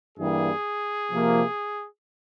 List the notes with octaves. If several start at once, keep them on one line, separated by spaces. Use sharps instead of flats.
G2 E3 G3 A#3 G#4
C3 F3 A#3